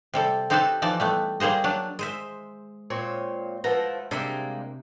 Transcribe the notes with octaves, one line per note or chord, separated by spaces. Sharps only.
C3 G3 A4
C4 D#4 G4 A4 B4 A5
E3 F3 D#4 D5 A5
G3 A3 B3
G3 A#3 G#4 C5 D#5
F#3 D4
G#3 C5 E5
A#2 C4 C#5
F3 A3 E4 B4 F#5 A#5
C3 G3 G#3 A#3 D4 E5